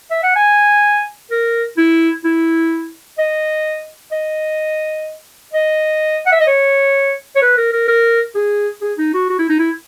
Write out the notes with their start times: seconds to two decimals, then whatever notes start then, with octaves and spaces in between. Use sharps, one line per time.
0.11 E5
0.23 F#5
0.36 G#5
1.31 A#4
1.77 E4
2.24 E4
3.18 D#5
4.12 D#5
5.53 D#5
6.26 F#5
6.32 E5
6.41 D#5
6.47 C#5
7.36 C#5
7.42 B4
7.57 A#4
7.73 A#4
7.88 A#4
8.35 G#4
8.82 G#4
8.98 D#4
9.14 F#4
9.30 F#4
9.39 E4
9.50 D#4
9.59 E4